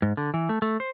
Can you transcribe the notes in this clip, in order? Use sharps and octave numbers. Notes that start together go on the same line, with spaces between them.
G#2
D3
E3
A3
A3
C5